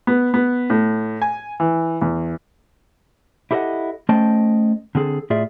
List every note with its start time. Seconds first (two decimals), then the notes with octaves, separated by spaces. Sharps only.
0.07 B3
0.34 B3
0.70 A2
1.22 G#5
1.60 E3
2.02 E2
3.51 E4 G4 A4 B4 D#5 F#5
4.09 A3 C#4 C5 D#5 G5 A5
4.95 D3 C4 G#4 A4
5.30 A2 F4 G#4 D5 E5